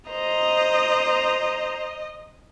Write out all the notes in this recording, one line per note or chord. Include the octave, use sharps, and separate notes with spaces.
C5 D#5 A#5